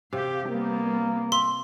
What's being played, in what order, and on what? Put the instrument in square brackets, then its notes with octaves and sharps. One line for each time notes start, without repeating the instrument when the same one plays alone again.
[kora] C3 [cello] G4 F5
[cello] G3 B3 [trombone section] A#3
[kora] E5 [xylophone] C6